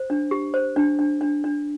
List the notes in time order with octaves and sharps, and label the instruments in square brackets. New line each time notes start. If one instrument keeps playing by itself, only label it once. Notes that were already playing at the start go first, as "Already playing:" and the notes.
Already playing: [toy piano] C5
D4
G4
C5
D4
D4
D4
D4